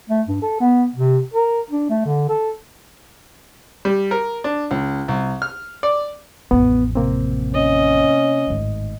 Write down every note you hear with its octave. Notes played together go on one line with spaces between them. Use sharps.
A3
G2
A4
B3
C3
A#4
D4
A3
D3
A4
G3
A#4
D4
C#2
C2
F6
D5
A1 F2 B3
C3 A#3 C4
C#4 D#5
G#1 A2